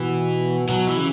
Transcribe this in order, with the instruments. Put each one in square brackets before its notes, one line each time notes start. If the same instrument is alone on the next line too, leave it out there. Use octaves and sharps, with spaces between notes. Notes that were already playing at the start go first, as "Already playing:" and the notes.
Already playing: [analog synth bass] B2 [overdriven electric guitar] E3
[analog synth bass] B2 [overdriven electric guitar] F#3
[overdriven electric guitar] E3
[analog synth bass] C#3